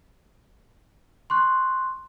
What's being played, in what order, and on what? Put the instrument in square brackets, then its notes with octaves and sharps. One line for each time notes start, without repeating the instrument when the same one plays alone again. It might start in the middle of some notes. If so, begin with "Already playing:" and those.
[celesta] C6 C#6 F#6